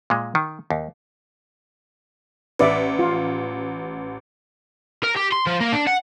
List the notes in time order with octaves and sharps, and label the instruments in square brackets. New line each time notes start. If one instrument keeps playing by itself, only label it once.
[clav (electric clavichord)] A#2 G#3
D#3
D#2
[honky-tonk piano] A1 [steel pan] B4 D5 E5
[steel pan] F4
[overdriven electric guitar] A#4
G4
C6
F3
A#3
D4
F#5